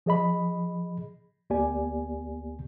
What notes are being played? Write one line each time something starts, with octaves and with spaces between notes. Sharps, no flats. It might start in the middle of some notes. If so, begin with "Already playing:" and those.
F3 G#4 D#5 B5
D2 A#3 B3 G4 D5 G#5